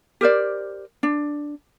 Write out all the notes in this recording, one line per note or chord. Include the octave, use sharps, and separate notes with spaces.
G4 A#4 C5 D5
D4